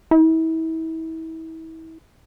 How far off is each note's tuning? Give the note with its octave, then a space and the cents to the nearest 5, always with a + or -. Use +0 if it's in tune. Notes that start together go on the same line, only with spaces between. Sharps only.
E4 -35